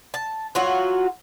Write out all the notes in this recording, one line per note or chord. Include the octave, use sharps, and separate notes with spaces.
A5
F#3 F4 F#4